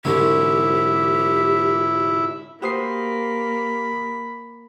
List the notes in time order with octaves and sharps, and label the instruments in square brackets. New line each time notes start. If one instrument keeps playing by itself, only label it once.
[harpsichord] C2 F#3 [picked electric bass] G#2 D3 [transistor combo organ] E4 [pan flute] G4
[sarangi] A#3 [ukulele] F#4 C5 [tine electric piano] G4 D#6 C7 [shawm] B5